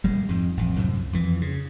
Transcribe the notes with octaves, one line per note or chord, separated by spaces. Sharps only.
D#1 G3 G#3
F2 G#2
A1 F2
C2 F#2 A2
F2 E3
C#3